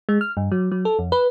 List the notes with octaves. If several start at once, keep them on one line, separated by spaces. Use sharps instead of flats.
G#3
F6
G2
F#3
F#3
A4
F2
B4